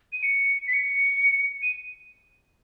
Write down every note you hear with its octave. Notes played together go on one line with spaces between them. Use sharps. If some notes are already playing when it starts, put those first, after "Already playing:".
D#7
C#7
B6
C#7
D#7